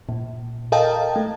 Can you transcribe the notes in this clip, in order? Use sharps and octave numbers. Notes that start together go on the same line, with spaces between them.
A#2
A4 A#4 D#5 F5 G5 A5
A3